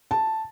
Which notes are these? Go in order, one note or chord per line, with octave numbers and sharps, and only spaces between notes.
A5